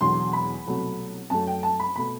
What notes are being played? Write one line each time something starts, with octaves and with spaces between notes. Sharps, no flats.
E1 E2 D3 F#3 C6
B5
C2 B2 F#3 A3
F#2 F#3 A3 A5
G5
A5
B5
B2 A3 B5